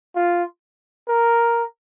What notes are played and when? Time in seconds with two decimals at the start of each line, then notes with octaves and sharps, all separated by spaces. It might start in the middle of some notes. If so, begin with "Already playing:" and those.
0.16 F4
1.08 A#4